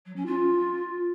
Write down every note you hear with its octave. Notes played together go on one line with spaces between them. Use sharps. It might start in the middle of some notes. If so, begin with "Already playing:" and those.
F#3
C#4
F4